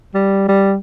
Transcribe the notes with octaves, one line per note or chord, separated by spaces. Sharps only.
G3
G3